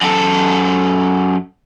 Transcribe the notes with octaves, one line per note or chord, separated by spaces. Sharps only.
F#2 A4